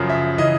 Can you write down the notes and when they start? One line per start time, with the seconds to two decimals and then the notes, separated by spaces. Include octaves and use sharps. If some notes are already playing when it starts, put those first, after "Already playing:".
Already playing: F#2 C#3 F3
0.10 E5
0.38 C#3 E3 D#5